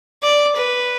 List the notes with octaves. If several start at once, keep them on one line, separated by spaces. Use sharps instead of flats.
D5
B4